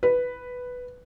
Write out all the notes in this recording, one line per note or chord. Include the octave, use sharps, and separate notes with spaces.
B4